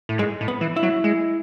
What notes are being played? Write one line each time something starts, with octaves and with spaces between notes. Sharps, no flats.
A2
G#2 G#3
A2
B3
E3
E4
F#3
G#3